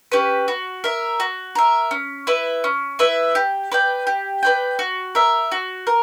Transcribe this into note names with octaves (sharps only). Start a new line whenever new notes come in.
C#4 G4 B4
F#4
A#4 E5
F#4
A#4 E5
C#4
E4 B4 E5
C#4
E4 B4 E5
G4
B4 D5 G5
G4
B4 D5 G5
F#4
A#4 E5
F#4
A#4